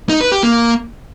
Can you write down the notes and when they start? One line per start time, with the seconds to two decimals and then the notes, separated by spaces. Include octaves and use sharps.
0.09 D#4
0.21 B4
0.32 G4
0.43 A#3